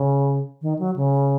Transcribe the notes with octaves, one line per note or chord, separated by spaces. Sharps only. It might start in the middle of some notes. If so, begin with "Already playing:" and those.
Already playing: C#3
D#3
F#3
C#3